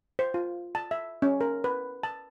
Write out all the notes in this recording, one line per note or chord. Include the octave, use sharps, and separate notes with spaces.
C5
F4
A5
E5
C#4
A#4
B4
A5